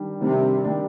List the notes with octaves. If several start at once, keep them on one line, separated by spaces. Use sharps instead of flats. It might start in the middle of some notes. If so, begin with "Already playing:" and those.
Already playing: D#3 G3 D4
C3 D#3 G3 D4
D#3 G3 D4